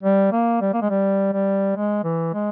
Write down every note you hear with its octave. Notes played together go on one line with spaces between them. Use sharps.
G3
A#3
G3
A#3
G#3
G3
G3
G#3
E3
G#3